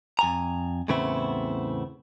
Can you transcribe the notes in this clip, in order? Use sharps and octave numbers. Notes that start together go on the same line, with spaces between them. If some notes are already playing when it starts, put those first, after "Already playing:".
F2 G#5 A#5
E2 A2 C#3 B3 C4 E4